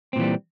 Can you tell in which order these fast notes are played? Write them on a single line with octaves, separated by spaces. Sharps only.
C4 A#2 E3 G3